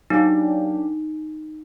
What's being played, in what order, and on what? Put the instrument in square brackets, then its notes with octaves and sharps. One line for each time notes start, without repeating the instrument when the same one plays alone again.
[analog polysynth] F#3 A#3 D4 G4 [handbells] D#4